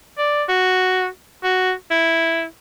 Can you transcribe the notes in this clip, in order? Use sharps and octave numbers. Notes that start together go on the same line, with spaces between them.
D5
F#4
F#4
E4